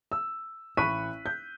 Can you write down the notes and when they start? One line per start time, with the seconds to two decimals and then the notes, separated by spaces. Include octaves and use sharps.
0.12 E6
0.77 A1 B5 C#6 F#6 B6 D#7
1.26 G6